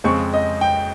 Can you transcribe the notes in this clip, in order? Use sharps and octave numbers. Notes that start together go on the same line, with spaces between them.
F2 C#3 G#3 C4 C#6
D#5
G5